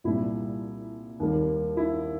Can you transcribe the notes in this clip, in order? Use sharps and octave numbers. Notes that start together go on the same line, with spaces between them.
C2 A#2 G3 E4
D#2 D#3 G3 A#3
E4